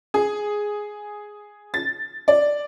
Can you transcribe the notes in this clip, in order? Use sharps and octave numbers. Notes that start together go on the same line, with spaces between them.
G#4
A6
D5